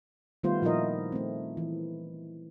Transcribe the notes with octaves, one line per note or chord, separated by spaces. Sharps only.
D#3 G3 A3 B3 F4 C5
A#2 F3 D#4 E4 A#4 D#5
A3 C4
E3